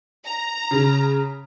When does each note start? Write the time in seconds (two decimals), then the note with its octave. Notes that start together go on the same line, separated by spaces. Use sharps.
0.25 A#5
0.71 C#3